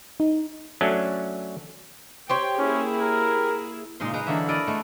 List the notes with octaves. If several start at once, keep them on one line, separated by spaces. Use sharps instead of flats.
D#4
F#3 A3 C#4 D4
G4 C5 C#5 G5
A#3 C#4 E4 G#4
A#4
A#2 C#3 G#3 D#4 F5 C6
G#3 D#4 B4 A#5
D3 E3 F#3 A#3 E5
E4 A4 A#4 D5 D#5
G#3 A3 B3